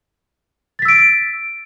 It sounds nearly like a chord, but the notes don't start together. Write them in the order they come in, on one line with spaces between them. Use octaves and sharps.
A6 B6 E6 D7